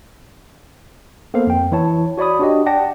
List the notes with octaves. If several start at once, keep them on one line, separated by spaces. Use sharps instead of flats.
A#3 B3 A4 C5 F5
F2 G5
E3 E4 C#5 A5
F#4 C#5 D5 B5 D#6
D4 F#4 G4 D#5
D5 F#5 G5 A5 A#6